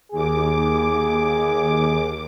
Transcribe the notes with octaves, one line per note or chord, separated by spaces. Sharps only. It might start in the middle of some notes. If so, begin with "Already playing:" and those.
D#2 G#4 D6